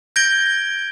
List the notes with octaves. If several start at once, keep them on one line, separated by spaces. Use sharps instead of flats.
G6 G#6 A#6 D7 G7